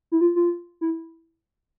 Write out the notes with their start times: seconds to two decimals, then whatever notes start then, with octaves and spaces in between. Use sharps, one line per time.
0.12 E4
0.21 F4
0.36 F4
0.81 E4